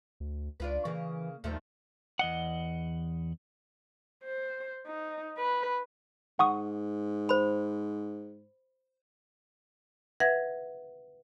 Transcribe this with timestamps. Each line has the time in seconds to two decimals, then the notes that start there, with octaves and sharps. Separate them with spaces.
0.20 D2
0.60 C#2 D4 F4 B4
0.85 C#3 E3 A#3
1.44 D#2 D#3 F3 A3
2.19 E2 D#5 F#5
4.24 C5
4.87 D#4
5.38 B4
6.39 G#2 F#5 C#6 D#6
7.29 C5 B5
10.20 B4 E5 F#5 G#6 A#6